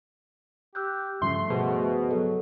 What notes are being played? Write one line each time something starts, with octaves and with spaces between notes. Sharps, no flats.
G4 E6 F#6 G6
G2 C#3 F3 A3 E5 C6
B2 F#4 G#4 C5
F#3 A4 D#5